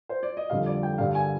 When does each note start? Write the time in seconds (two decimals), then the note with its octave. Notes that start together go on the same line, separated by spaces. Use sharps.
0.09 C5
0.23 D5
0.37 D#5
0.50 F2 D3 G3 F5
0.66 D5
0.83 G5
0.98 G2 D3 G3 F5
1.15 G#5